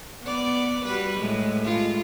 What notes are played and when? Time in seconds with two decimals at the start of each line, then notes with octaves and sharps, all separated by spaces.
0.23 B3 D5
0.85 G3 F#4 B4
1.19 A2 G#3
1.64 G#3 F4